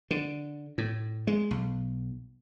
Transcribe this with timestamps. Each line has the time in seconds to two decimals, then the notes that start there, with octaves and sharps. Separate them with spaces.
0.11 D3
0.78 A2
1.27 G#3
1.51 B1